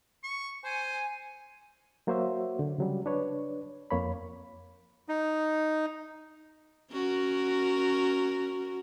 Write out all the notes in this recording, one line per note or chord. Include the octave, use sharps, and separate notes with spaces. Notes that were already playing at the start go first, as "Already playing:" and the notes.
C#6
C5 G#5
F#3 A#3 F#4 C5 C#5 E5
D3
C#3 F#3 G3
D4 B4 C#5
F2 A#3 C#5 B5
D#4
C#4 F#4 A#4